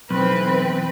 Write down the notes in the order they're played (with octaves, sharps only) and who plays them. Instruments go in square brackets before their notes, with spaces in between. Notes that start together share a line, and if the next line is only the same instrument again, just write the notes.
[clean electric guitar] B1 [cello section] E3 C4 B4